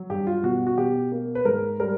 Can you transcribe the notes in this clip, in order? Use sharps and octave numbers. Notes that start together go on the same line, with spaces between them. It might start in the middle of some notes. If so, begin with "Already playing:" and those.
Already playing: F#3
G2 G4
F4
B2 F#4
F#4
B2 G4
A#3
B4
G#2 A#4
G3 A#4